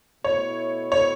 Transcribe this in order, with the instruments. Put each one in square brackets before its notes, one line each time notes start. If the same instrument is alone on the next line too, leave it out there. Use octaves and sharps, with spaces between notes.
[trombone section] B2 A3 E4 [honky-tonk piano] C#5
[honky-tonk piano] C#5